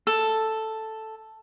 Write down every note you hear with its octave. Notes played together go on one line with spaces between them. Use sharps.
A4